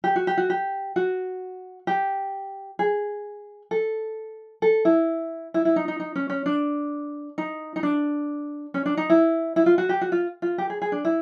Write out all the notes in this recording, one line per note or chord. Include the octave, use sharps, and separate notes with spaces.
G4
F#4
G4
F#4
G4
F#4
G4
G#4
A4
A4
E4
E4
E4
D#4
D#4
D#4
C#4
C#4
D4
D#4
D#4
D4
C#4
D4
D#4
E4
E4
F4
F#4
G4
F#4
F4
F4
G4
G#4
G#4
D4
E4